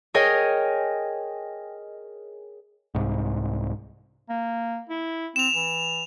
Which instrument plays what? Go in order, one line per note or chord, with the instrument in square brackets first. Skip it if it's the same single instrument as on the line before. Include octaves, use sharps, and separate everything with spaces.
[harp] G#4 A#4 C#5 D#5 G5 G#5
[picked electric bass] C2 G#2
[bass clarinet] A#3
E4
[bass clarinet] C4 [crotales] E7 F7
[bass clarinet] E3